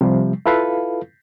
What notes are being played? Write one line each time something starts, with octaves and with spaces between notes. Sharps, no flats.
C3 F3 G3
E4 F4 A4 B4 F5